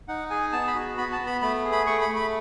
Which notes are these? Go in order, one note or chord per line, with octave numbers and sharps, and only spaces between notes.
D#4 F#5
G#4 G#5
B3 A5
B5
F#4
B3 B5
A5
B3
B5
A3 B5
G#4
B5
A3 C#6
B5
A3
B5